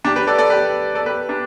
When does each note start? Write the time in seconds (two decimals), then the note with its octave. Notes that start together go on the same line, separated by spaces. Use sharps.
0.04 D4 G4
0.16 G4 B4
0.27 A4 D5
0.38 A4 D5
0.50 G4 B4
0.95 A4 D5
1.06 G4 B4
1.29 D4 G4